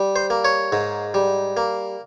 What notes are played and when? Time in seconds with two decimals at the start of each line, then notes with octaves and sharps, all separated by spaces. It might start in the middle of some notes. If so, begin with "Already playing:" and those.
Already playing: G3
0.16 C5
0.30 A#3
0.45 C#5
0.72 G#2
1.14 G3
1.57 A#3